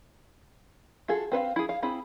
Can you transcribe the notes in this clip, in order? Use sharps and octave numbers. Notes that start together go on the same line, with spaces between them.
F4 F#4 G#4 A4
C4 B4 C5 F5
E4 G#4
F5
C4 E4 G#4 B5